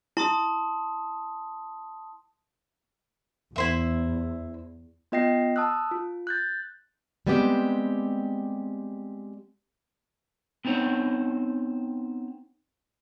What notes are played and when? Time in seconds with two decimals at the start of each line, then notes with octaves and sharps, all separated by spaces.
0.17 E4 A5 C6 D#6
3.56 E2 E4 C5 E5
5.12 B3 F4 D#5 G5 A#6 C7
5.56 A5 D#6 E6 F#6
5.91 F4
6.27 F#6 G6 A6
7.27 G3 G#3 B3 C4 G4
10.65 B3 C4 D#4 C5 C#5